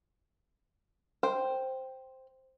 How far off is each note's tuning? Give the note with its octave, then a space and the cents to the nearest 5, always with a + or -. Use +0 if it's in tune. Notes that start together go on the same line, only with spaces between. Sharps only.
C5 +0 G5 +0